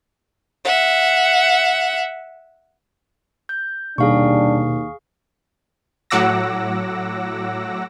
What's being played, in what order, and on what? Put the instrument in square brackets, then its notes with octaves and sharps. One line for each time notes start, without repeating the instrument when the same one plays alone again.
[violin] E5 F#5
[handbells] G6
[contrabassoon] D#2 [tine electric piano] B2 [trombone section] G3 D4 [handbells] G#4 F5 C#6
[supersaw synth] A2 F#3 F#5 D6 E6 A#6